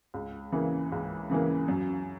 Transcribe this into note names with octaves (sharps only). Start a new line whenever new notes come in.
C#2
C#3 E3 A#3
C#2
C#3 E3 A#3
F#2